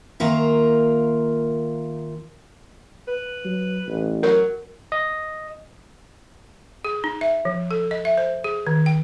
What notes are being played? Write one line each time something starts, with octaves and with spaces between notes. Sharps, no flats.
D#3 A#3 F4 A#4 E5
B4
F#3
A1
F#3 A#4
D#5
G#4
D#4
E5
F3
A4
D#5
E5
C5
G#4
D#3
G5